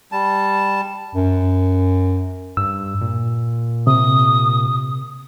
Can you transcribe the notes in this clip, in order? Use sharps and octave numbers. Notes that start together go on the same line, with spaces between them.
G3 A5
F#2
G2 E6
A#2
C3 D#6